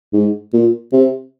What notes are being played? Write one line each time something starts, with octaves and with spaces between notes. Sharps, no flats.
G#2
A#2
C3